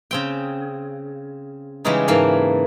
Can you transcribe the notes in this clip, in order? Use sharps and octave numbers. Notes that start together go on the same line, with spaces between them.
C#3 C4 G5
C#3 E3 G3 G#3 C#4 D#4
G#2 E3 A#3 A4 F5